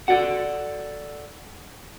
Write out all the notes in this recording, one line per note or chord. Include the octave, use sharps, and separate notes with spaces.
F#4 A4 D5 F#5